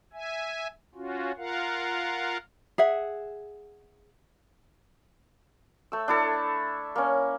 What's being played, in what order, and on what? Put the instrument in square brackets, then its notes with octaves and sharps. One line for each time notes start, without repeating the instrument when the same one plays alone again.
[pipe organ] E5 G#5
C#4 F4 F#4
F4 A#4 F5 F#5
[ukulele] G#4 E5 F#5
[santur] A3 E6
D4 E4 A4
A#3 C#4